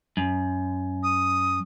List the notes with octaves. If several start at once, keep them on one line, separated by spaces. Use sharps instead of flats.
F#2
D#6